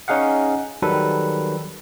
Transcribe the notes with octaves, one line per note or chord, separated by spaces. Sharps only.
C#4 D#4 G#4 F5 F#5
D#3 F#3 G3 A4 B4